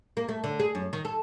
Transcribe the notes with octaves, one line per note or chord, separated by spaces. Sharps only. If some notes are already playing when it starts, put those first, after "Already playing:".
A#3
A3
D3
G#4
F#2
D#3
A4